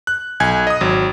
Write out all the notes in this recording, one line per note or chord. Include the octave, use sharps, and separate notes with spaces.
F#6
B1 G#5 G#6
D#5 D#6
G#1 F#3